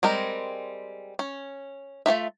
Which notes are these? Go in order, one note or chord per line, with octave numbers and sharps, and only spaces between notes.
G3 G#3 C4 A#4
C#4
A3 C#4 F4 E5